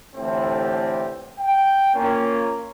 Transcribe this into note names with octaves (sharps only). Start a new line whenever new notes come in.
A2 D3 E3 C4 F4 G4
G5
A#3 C#4 F4